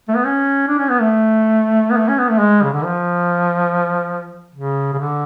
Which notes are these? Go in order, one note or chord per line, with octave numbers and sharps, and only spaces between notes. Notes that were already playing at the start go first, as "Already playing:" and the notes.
A3
B3
C#4
D4
C#4
B3
A3
B3
A3
C#4
B3
A3
G#3
C#3
D3
F3
C#3
C#3
D3